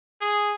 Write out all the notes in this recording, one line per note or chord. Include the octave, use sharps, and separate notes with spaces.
G#4